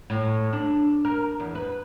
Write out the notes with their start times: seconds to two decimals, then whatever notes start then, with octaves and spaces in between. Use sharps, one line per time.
0.10 A2
0.53 D4
1.05 A#4
1.40 E2
1.55 B4